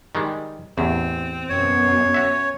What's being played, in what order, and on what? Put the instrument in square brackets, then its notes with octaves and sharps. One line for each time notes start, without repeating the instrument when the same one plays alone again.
[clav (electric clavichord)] D#3 G3 G#3
[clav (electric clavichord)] A1 E2 [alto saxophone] C4
[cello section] F#2 B2 [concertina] C#5
[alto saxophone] C#4 [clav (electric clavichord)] F#4 E5